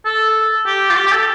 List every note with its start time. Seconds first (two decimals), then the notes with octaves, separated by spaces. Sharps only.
0.05 A4
0.66 G4
0.90 F4
0.97 G4
1.07 G4
1.12 A4